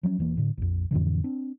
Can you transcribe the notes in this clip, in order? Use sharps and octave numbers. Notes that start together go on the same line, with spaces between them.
F3 F#3 A3 C#4
E1 E3 A#3
A2 D3
A#1 F2
F2 A2 D3 E3
C4 D4